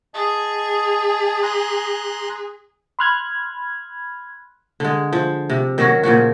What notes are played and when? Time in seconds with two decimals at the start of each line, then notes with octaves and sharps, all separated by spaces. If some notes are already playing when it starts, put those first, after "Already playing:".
0.14 G#4 D#5 A5
1.43 A#5 C6 F#6
2.99 B5 C6 F6 F#6 G#6
4.80 D3 G#3
5.13 F3
5.50 C3
5.78 D#3 F#3 C#4 F#4
6.03 A#2 C#3 F3 F#4